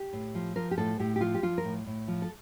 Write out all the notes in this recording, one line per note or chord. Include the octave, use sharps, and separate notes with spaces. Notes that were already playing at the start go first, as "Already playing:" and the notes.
Already playing: G4
A2
F3
F3 A#4
G4
A2 A4
A2 G4
G4
F3 F4
G4
F3 F4
A#4
A2
A2
F3
A4